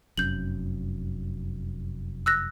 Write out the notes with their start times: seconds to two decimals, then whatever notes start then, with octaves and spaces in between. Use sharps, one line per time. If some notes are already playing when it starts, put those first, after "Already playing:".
0.18 F1 F#2 G6 F#7
2.26 E6 F#6 A#6